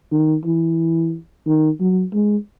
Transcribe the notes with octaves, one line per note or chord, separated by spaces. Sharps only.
D#3
E3
D#3
F#3
G#3